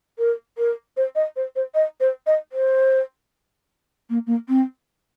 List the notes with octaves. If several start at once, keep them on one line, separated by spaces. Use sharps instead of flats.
A#4
A#4
C5
D#5
C5
C5
D#5
C5
D#5
C5
A#3
A#3
C4